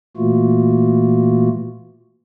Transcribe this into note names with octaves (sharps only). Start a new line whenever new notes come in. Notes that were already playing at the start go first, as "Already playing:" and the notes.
A#2 E3 A3 A#3 F4 F#4